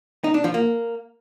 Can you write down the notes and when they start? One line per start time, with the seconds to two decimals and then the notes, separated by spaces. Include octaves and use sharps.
0.24 D#4
0.34 D4
0.44 F3
0.54 A#3